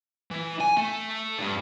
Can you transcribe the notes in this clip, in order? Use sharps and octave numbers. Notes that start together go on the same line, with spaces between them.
E3
G#5
A3
G2